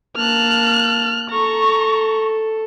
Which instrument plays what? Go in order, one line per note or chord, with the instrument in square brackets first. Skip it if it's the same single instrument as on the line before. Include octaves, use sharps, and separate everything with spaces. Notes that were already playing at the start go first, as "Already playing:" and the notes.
[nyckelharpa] A#3 A5 [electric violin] F6 F#6
[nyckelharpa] A4 [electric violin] A#5 C#6